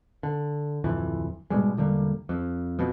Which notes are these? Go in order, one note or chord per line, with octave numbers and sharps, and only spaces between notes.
D3
D1 F2 E3
G#2 B2 G3 G#3
E1 D3 G3 A#3
F2
F2 B2